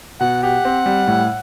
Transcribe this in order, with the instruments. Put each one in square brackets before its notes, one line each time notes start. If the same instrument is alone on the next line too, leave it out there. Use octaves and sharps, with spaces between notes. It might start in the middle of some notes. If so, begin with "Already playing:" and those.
[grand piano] B2 [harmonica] F#5
[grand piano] G4 [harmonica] F#5
[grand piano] C4
G3
A2